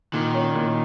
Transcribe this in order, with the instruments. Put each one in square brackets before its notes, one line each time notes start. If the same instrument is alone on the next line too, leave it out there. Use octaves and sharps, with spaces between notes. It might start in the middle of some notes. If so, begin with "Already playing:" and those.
[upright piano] A#2 [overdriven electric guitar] D#3
[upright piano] C#4
A#2